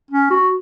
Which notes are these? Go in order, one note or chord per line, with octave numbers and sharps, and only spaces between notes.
C#4
F#4